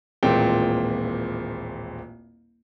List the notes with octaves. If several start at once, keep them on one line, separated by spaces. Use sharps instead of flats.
D#1 A1 A#2 G#3 C4 G5